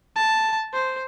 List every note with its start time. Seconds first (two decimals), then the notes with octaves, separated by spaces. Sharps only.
0.16 A5
0.73 C5